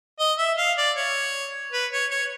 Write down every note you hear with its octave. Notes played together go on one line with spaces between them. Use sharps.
D#5
E5
F5
D5
C#5
B4
C#5
C#5